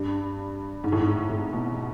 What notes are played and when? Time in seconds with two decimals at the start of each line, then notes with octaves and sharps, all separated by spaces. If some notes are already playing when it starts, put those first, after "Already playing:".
Already playing: G2
0.84 G#2
0.92 A2
1.00 G#2
1.30 A2
1.53 B2